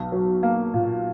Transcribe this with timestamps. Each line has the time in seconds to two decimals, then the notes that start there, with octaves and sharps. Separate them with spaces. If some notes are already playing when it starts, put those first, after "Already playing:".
Already playing: B1
0.12 F#3
0.43 A#3
0.74 A#2